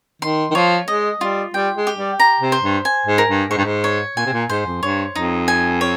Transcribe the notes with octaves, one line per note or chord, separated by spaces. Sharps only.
D#3 C6
D#3
F3 C#5
G#3 D#5
G3 F4
G3 G5
G#3
G4
G3
A#5
C3
C5
G2
G#5
G#2
A#4
G2
G#2 C#6
G2
G#2
C#5
A#2 G#5
C3
A#2
G#2 C5
F2
G2 C#5
F2 D#4
G#5
C#5